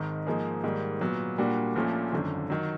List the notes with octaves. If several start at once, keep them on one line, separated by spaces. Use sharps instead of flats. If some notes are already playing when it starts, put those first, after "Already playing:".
Already playing: G#1 G#2 D#3
G#2 F3 A#3 D#4 G#4
G#2 D#3 G3 A#3
A#2 F#3 B3
A#2 G3 A#3 D4 F#4
A#1 A#2 F3 A3 C#4
G#1 F#2 D3
D#3 F#3